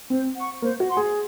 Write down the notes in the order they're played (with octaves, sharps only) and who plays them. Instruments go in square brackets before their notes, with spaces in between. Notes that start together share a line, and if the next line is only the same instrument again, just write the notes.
[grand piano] C4 [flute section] C5
[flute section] F#5 C#6
[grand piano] A#3 [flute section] C5
[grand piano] F#4
[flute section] F#5 C6
[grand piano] G#4